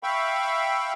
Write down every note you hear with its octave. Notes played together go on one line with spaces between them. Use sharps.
E5 F5 G5 B5 C#6